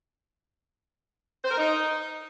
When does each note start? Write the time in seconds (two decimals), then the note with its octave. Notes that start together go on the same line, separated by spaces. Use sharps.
1.44 C5
1.51 A#4
1.58 D#4